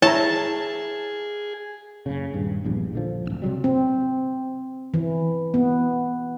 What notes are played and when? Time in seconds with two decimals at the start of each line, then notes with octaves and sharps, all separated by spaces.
0.02 E4 G#4 C#5 A5 A#5
2.06 F#1 C#3
2.34 D#1 G2
2.64 A#1 E2 G2
2.93 A#1 D3 F3
3.26 D1 A#1
3.42 C3 D#3 F#3 G3
3.64 C4
4.94 E3
5.54 B3